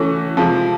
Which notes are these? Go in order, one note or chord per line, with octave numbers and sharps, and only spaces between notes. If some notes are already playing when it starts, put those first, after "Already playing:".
Already playing: E3 A3 C#4 F#4
C3 F3 G#3